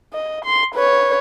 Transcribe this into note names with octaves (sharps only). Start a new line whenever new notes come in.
D#5
C6
B4 C#5